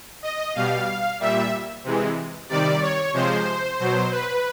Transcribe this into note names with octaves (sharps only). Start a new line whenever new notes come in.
D#5
B2 G3 F5
A#2 G3 E5
C3 E3 G#3
C3 D#3 G3 D5
C#5
C3 F3 G#3 C5
B2 F#3 C5
B4